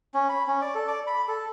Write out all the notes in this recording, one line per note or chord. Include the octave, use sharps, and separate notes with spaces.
C#4
B5
C#4
D5
A4
D5
B5
A4